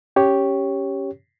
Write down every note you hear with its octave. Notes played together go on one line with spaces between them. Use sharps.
C#4 G4 C#5